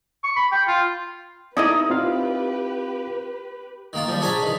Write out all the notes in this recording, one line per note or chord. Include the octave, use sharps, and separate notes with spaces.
C#6
B5
G5
F4
D#4 E4 G4 B4 D5 D#5 A#5
C4 F4 F5
D#3 A#3 F4
F3 G3
C#4 D4 G#4 G#5 A#5 B5
D#3 E3